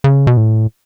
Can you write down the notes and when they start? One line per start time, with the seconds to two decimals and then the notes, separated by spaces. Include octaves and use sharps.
0.04 C#3
0.27 B2
0.37 A2